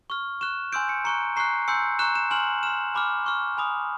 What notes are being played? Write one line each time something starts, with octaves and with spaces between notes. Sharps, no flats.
C#6 F6
C#6 F#6 E7
G#5 C6 E6 G6 D7
C#7
A#5 C#6 F#6 C#7
A#5 C#6 F#6 C7
G#5 C6 E6 G6 C#7
A#5 C#6 F#6 E7
E7
G#5 C6 F6 F#7
C6 F6 E7
G#5 B5 D6 F6
C#6 F6
G#5 B5 D#6